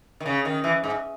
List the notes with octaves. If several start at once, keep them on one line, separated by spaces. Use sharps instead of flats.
D#3
C#3
D#3
E3
G#2